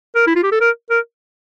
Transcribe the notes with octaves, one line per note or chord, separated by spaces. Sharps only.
A#4
E4
F4
G4
A4
A#4
A#4